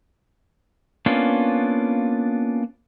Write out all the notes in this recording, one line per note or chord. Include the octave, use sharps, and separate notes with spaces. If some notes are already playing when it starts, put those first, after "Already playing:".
A#3 B3 C#4 D4 F4